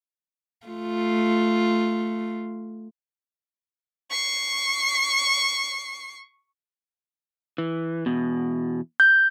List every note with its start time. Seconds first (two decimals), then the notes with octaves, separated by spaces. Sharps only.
0.66 A3 F4
4.11 C#6 C7
7.58 E3
8.06 E2 B2
9.00 G6